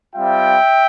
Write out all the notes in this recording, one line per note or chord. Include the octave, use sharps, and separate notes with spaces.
G3 C4 F4 E5 G5